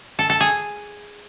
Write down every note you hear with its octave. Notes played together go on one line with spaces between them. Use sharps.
A4
A4
G#4